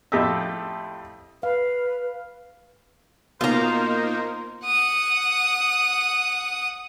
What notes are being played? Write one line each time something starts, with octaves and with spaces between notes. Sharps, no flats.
F2 A2 G4 A4 D#5 E5
B4 F5
B2 A#3 D#4 F4 A#4 C5 A#5
F#5 D#6